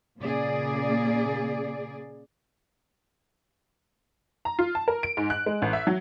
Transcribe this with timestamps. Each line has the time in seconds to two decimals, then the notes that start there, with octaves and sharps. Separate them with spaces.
0.21 A#2 C#3 A#3 G#4 D5
4.45 A#5
4.59 F4
4.75 A5
4.88 A#4
5.03 D7
5.17 G#2
5.30 F#6
5.46 G#3
5.62 A1
5.73 E5
5.87 F#3